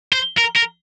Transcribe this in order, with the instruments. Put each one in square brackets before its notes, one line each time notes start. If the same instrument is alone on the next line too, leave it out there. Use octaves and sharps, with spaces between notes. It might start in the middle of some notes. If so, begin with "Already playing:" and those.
[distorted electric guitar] C5
A#4
A#4